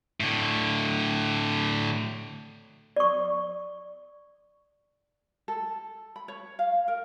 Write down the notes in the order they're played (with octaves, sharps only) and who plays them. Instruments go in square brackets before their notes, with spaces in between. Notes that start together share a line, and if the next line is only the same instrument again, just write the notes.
[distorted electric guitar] A2 D3
[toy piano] D5 C#6
[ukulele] A4
B5
C#5
F5
A#4